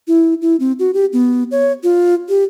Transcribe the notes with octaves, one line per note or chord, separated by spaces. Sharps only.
E4
E4
C4
F#4
G4
B3
C#5
F4
G4